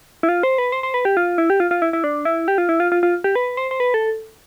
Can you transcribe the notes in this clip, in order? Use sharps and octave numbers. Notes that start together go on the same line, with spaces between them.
E4
F4
C5
B4
C5
C5
B4
G4
F4
E4
G4
F4
F4
E4
E4
D4
E4
G4
F4
E4
F4
F4
F4
G4
B4
C5
C5
B4
A4